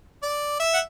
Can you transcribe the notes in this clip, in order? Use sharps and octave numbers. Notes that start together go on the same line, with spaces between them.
D5
E5
F#5